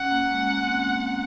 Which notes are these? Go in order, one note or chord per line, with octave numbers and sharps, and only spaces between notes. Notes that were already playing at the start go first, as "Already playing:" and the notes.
Already playing: C#4 F#5
A#3
G#3
A#3
C4
A#3